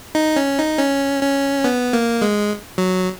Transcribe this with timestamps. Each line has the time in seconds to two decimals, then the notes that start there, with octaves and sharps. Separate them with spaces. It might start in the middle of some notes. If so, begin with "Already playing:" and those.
0.15 D#4
0.36 C#4
0.58 D#4
0.79 C#4
1.23 C#4
1.64 B3
1.93 A#3
2.21 G#3
2.78 F#3